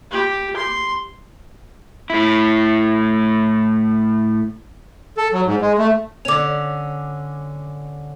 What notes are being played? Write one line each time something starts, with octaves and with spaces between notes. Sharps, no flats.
G4
C6
A2 E4
A4
F#3
G#2
G#3
A3
D3 C#4 D6 F7